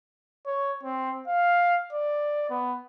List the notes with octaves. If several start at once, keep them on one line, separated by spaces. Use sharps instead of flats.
C#5
C4
F5
D5
B3